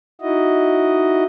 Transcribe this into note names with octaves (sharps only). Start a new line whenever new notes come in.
D#4 E4 F#4 D#5